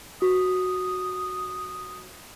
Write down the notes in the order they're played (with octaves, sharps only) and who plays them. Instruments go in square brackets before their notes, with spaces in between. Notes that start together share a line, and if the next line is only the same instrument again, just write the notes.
[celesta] F#4 [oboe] D#6